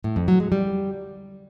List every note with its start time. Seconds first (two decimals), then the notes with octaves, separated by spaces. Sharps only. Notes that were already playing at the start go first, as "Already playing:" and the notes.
0.04 A2
0.16 F2
0.28 F#3
0.40 G#3
0.52 G3